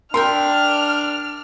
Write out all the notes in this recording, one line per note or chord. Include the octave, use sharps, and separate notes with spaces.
D4 A#4 E5 G5 C6 F6